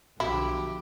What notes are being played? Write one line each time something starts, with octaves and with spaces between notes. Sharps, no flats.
B1 D3 F3 E4 F#4 G4